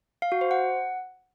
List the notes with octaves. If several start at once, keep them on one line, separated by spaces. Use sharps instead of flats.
F5
F#4
C5
F#5